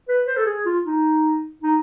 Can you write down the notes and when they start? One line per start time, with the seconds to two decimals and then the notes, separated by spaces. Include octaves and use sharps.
0.08 B4
0.27 C5
0.37 A4
0.46 G#4
0.66 F4
0.85 D#4
1.62 D#4